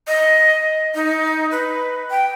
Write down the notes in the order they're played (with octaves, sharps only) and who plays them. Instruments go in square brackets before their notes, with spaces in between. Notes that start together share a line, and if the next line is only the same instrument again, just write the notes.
[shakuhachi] D#5
D#4
B4
G5